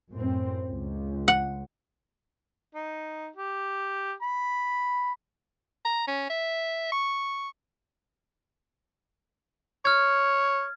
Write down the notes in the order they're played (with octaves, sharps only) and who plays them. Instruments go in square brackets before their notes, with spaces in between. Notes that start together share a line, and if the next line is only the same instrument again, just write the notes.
[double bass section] F#2 A2 C4
C#2
[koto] F#5
[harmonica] D#4
G4
B5
[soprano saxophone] A#5
C#4
E5
C#6
[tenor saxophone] C#5 [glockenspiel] F6 G#6